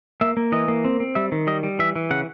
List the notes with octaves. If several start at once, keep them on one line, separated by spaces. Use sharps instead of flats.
A#3 E5
A#3
E3 D#5
A#3
C4
C4
G3 E5
D#3
G3 D#5
G3
E3 E5
E3
C#3 F#5